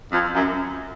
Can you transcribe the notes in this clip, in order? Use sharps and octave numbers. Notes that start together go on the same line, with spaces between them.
F2
F#2